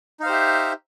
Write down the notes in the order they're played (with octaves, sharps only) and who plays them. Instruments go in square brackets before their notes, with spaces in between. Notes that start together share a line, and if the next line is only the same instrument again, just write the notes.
[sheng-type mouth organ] D#4
F5
C5
G4
E5